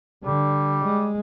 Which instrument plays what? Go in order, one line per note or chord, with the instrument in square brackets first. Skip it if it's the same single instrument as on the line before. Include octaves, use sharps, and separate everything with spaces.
[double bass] D3 [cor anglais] G3
[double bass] G#3